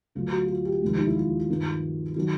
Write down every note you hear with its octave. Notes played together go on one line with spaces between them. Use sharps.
D2 D3 F#3 F4
F#4
F4
F#4
G4
F1 D#2 D#3 G#3
D#4
E4
F4
G2 D#3 G3 C4
D#3 F#3